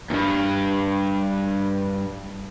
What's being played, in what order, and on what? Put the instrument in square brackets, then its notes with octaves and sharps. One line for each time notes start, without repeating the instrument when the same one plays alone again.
[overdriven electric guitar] D2 G2